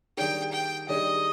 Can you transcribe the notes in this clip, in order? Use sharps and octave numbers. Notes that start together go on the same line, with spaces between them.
D#3 G3 D4 G#4 G5
G5
D#3 G3 D4 G#4 D#5